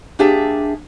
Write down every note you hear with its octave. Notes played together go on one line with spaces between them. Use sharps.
A#3 D4 G4 G#4 E5 A5